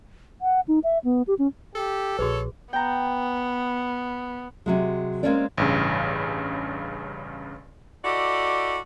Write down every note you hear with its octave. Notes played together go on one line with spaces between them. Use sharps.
F#5
D#4
E5
B3
G4
C#4
G4 A4
A#1 F#4 G#4 B4 C#5
B3 G5 A#5
C3 F#3 G#3
G#3 A#3 C4 C#4 C#5 D5
A1 G2 C#3
E4 F#4 G4 A4 D5 D#5